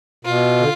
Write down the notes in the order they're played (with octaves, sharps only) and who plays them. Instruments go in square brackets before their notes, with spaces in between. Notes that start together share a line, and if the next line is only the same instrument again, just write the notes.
[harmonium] B2 [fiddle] F4
[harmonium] D3